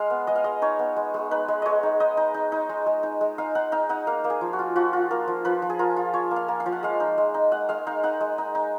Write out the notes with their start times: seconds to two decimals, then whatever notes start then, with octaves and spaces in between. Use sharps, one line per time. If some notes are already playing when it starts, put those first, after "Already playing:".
Already playing: G#3 F5
0.10 B3
0.27 G#3 D#5
0.36 F5
0.44 G#3 D#5
0.62 D#4 C#5
0.79 B3
0.96 G#3
1.14 G#3
1.31 D#4 B4
1.48 G#3
1.62 G#3 C#5 D#5
1.83 D#4
2.00 D#4 D#5
2.17 D#4
2.34 D#4
2.52 D#4
2.69 G#3
2.86 G#3
3.03 D#4
3.21 G#3
3.38 D#4 F5
3.55 D#4 F#5
3.72 D#4 F5
3.89 D#4 F#5
4.07 A#3 F5
4.24 A#3
4.30 G#4
4.41 F3
4.53 F#4
4.59 F4
4.76 F3 F#4
4.93 F4
5.11 A#3 A#4
5.28 F3
5.45 F3 B4
5.62 F3
5.70 G#4
5.79 F4 A#4
5.97 F4
6.13 F3 C#5
6.31 A#3
6.36 F5
6.48 A#3
6.60 F5
6.66 F3
6.72 F#5
6.83 G#3 F5
7.00 D#4
7.18 G#3
7.34 D#4
7.52 G#3 F#5
7.69 G#3 F5
7.87 D#4 F5
8.03 D#4 F#5
8.20 G#3
8.38 D#4
8.55 D#4